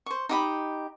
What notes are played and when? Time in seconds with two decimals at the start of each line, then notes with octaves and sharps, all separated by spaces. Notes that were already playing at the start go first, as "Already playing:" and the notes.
0.06 C5 C#6
0.29 D#4 G4 B5